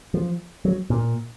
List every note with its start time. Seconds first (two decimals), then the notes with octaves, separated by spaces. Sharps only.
0.14 F3
0.65 F#3
0.90 A#2